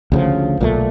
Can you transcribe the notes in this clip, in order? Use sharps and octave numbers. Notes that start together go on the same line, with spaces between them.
D2 C#3 F3
B1 A#2 F3 A3